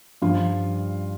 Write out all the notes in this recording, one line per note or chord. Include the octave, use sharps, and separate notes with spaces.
G2 F3 F4